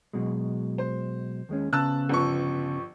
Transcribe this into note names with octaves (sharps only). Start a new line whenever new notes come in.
B2 F#3 G#3
C5
D#2 G#3 C#4
C#3 B3 A5 E6 F#6
G1 F3 C#6